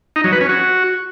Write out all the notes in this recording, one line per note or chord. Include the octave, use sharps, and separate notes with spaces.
D#4
F#3
B4
C#4
F#4